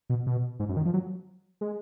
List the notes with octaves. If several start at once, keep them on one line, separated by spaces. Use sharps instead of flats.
B2
B2
G#2
F#2
D#3
F3
F#3
G#3